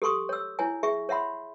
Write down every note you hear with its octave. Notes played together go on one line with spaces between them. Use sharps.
G4 A4 C6 C#6 D#6
C#5 E6
E4 C#5 G#5
G#4 E5 C#6
C#5 E5 F#5 B5 C6